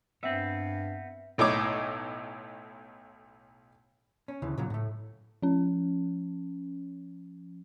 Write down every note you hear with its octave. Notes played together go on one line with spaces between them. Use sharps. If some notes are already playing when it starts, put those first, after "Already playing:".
G2 B3 C4 E5
B1 A2 D#4 C#5 D6
C#4
D2 C#3 E3
A#2 C#3 F#3
A2 A3
F3 C#4